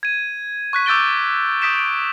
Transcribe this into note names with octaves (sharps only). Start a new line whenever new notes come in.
G#6 D#7
C#6 F#6 B6
D6 E6 G6 A6 D7 G7
D#6 G6 B6 D7 E7
D7